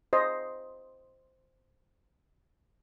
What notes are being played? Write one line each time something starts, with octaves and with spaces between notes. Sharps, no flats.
C5 D#5